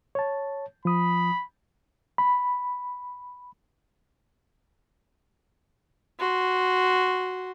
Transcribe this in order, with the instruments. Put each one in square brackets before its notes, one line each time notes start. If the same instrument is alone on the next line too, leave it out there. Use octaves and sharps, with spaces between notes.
[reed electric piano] C#5 A5
[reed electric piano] F3 D#6 [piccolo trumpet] B5
[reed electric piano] B5
[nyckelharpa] F#4 C6